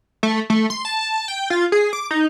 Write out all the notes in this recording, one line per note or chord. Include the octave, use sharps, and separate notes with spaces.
A3
A3
C6
A5
G5
F4
G#4
D6
D#4